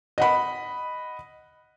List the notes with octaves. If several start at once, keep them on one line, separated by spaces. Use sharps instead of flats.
D#5 F#5 B5